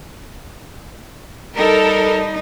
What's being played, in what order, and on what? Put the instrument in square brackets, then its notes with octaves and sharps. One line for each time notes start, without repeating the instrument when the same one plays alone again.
[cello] G3 D#4 [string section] A4 A#4